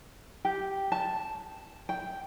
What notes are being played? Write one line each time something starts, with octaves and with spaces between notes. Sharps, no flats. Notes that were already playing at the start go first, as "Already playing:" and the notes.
G4
A5
G5